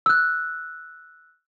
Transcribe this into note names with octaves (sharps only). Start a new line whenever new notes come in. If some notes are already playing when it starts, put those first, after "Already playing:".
E6 F#6